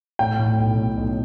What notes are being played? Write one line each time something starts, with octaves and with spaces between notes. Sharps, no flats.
A2 G5
A2
B1
A2
B1